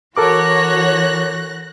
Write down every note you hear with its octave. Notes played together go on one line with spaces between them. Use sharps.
E3 F#4 A4 A#4 C#5 D6 F#6 A#6